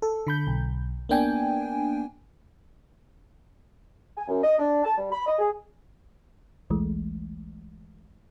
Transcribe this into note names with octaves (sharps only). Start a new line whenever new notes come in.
A4
D3 B5 G6
B1
A#3 B3 D4 G5 G#5
G#5
F#2
D#5
D4
A5
G3
B5
D#5
G#4
A#1 D#2 E3 G#3 A3